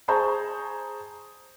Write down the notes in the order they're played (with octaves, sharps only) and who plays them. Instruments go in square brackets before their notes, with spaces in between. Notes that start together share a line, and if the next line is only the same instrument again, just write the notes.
[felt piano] G#4 C5 A5 A#5 C#6 G6